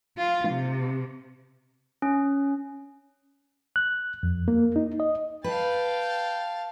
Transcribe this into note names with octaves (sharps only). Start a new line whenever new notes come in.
F4
C3
C#4
F#6
F2
A#3
D#4
D#5
B4 F5 G5 A5